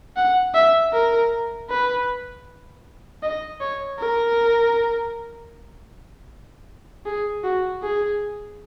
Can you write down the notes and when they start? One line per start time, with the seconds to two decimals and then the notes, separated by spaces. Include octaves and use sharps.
0.17 F#5
0.55 E5
0.93 A#4
1.70 B4
3.23 D#5
3.61 C#5
4.00 A#4
7.06 G#4
7.44 F#4
7.82 G#4